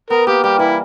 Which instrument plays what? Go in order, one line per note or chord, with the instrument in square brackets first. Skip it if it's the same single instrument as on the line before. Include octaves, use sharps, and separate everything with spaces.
[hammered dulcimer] B3 [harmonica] A#4
[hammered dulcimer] A#3 [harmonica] G4
[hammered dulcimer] G3 [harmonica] G4
[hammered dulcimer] E3 [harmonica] E4